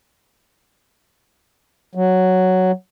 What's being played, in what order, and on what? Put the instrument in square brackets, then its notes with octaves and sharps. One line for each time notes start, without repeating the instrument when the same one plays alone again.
[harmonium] F#3